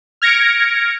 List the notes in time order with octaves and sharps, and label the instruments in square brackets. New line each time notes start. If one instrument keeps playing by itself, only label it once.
[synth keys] F6 G#6 A#6 C#7 D7